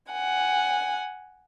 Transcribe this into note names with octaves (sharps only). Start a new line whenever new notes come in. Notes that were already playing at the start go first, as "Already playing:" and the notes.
F#5 G#5